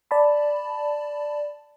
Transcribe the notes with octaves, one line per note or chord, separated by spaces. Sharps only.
D5 A5 B5